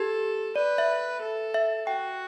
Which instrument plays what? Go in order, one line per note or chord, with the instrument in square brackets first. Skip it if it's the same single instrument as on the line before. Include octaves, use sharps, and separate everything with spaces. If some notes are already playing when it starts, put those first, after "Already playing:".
Already playing: [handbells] G4 [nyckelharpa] A4
[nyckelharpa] B4 [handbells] D5
[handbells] E5
[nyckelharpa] A4
[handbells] E5
[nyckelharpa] F#4 [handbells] G5